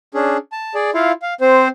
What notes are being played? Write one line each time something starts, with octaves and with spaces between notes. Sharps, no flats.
C#4 D4 G#4
A5
G#4 D5
E4 F4 F5
F5
C4 C5